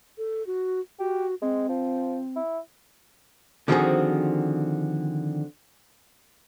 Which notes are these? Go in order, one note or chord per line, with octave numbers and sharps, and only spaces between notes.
A4
F#4
F#4 G4
G#3 C4
F3
E4
D3 D#3 F3 C4 F#4 G#4